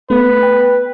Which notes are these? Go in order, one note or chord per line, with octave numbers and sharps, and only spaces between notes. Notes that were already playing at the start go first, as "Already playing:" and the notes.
A3 B3 B4
G5